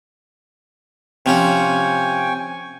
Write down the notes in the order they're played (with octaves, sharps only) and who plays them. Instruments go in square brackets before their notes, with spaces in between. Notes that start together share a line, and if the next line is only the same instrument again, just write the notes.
[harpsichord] C3 F3 C#4 [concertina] G5 G#5 C#6